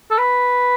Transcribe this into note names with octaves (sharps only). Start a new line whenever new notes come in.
A4
B4